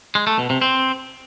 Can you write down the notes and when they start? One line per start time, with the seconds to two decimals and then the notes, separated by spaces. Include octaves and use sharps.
0.15 G#3
0.27 A3
0.38 B2
0.50 C3
0.61 C4